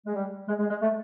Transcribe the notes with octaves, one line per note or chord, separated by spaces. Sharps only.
G#3
G3
G#3
G#3
G#3
A3